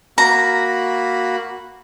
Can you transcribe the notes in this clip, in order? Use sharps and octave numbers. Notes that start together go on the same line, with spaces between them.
A#3 F#4 A#5 B5